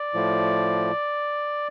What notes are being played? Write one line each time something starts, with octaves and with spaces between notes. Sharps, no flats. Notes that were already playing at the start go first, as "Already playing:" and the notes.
Already playing: D5
A2 F3